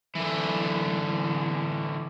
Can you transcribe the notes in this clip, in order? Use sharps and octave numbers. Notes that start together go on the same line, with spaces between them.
D3 E3